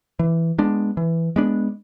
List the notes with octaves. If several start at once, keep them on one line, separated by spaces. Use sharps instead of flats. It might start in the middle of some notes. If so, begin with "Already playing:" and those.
E3
G#3 B3 D4
E3
G#3 B3 D4